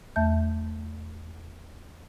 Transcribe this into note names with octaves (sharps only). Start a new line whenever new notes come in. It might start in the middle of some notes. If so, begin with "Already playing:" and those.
E2 A3 E5 A5 G6